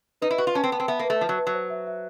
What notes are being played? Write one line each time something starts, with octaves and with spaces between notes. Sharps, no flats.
D#4 B4
E4
F#4 B4
F4
C#4 A5
C4
B3 A5
C4
B3 E5
A#3 B4
A3
F3 A5
F#3
B4
F#3
C5
E5
E5